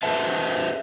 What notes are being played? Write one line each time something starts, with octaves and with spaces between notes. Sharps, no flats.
G#4 A4 B4 C5 E5 A5